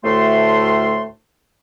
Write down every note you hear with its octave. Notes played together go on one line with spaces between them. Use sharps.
D2 A2 A3 C6